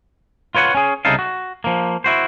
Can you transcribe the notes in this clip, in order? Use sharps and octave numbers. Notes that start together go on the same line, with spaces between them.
F4 B4 C#5 D#5 F#5
C#4 G#4
C2 C#3 D#4 E4 A4 F5
F#4
F3 A#3
E4 F#4 C5